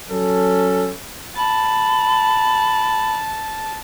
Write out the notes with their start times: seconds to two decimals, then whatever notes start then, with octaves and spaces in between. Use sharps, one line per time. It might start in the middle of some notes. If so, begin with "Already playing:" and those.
0.10 F#3 C#4 A4
1.36 A5 B5